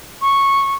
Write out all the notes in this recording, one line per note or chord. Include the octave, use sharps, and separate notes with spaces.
C#6